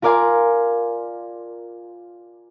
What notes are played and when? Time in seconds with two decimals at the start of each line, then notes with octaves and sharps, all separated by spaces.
0.02 F4 A#4 D5 F5 G#5 C6